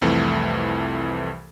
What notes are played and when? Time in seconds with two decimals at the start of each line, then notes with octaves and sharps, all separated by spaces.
0.01 C2 F2 E3 A3